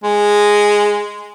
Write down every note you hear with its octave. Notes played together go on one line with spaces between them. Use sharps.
G#3